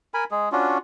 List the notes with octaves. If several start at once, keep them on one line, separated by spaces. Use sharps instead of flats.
A#4 G#5 B5
G#3 G#4
C#4 D4 F4 F#4